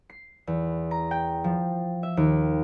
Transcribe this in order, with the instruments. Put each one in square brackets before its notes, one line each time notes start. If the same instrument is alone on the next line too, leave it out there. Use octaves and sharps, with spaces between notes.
[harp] C7
E2
A#5
G5
F3
E5
D#2